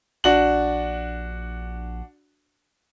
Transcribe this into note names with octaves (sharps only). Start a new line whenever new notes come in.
A#1 D4 F#4 F#7